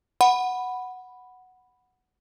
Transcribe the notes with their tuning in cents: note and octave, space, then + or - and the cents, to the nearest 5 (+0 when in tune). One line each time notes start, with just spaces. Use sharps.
F#5 +0 B5 +0